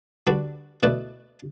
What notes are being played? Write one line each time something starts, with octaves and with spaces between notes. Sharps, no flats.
D3 G3 D4 F#4 B4
B2 A3 E4 B4 D5